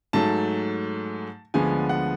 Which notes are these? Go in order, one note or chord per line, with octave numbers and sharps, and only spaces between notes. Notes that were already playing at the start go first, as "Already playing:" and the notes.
G#2 F#3 A3 A5
D2 D3 F3 G#3 B3 G#5
F#5